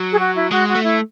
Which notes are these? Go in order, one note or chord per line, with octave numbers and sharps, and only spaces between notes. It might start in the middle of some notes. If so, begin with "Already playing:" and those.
Already playing: F#3
G#4
F#4
E4
G#3 F#4
F#4
A3
E4